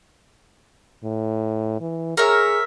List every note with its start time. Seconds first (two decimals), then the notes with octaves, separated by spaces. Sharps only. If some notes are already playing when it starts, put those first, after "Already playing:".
1.04 A2
1.80 E3
2.17 G#4 A#4 C#5 E5